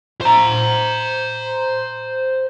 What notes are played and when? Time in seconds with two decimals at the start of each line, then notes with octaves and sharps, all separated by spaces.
0.21 C5 A#5